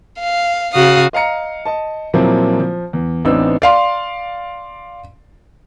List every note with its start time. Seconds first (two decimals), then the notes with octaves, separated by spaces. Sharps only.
0.20 F5
0.73 C#3 F#4 F5 D#6
1.13 D#5 F5 A#5 C#7
1.66 D#5 A5
2.14 A#2 F3 F#3 A#3 C4 E4
2.60 F3
2.93 E2
3.25 A1 B3 C4 D4 D#4 E6
3.62 D5 F5 C6